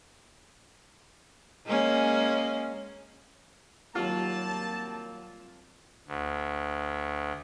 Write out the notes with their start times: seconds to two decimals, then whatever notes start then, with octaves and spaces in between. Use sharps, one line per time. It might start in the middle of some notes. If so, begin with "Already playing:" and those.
1.66 G#3 A#3 C#4
3.95 D#2 F#3 G3 A#3 C4 F4 A5
6.07 D2